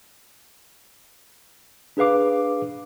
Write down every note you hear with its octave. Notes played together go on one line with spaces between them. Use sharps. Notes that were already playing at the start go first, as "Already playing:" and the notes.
D4 G#4 B4 F5 D6